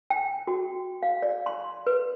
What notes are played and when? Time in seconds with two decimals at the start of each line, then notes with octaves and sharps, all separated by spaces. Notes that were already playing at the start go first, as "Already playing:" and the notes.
0.10 G5
0.47 F#4
1.03 F5
1.22 D5
1.46 C6
1.87 B4